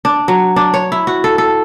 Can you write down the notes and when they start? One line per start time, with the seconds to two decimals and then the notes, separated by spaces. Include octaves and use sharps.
0.05 D4
0.28 F#3
0.56 D4
0.74 C#5
0.92 E4
1.07 F#4
1.24 A4
1.38 A4